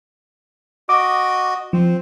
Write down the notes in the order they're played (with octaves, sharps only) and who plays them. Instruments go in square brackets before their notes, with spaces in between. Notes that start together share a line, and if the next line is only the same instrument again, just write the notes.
[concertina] F#4 D#5 [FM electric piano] D6
[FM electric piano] F3 [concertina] C4